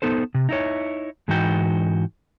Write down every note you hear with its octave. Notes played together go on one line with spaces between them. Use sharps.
B3 D#4 A4 C5
C3
D#4 E4 C#5
G#2 E3 D#4 F#4 G5